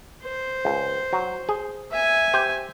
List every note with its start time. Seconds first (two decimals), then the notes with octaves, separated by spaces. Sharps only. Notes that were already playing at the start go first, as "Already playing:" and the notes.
0.24 C5
0.65 C#2
1.13 F#3
1.49 G#4
1.91 E5 G#5
2.33 G4 C5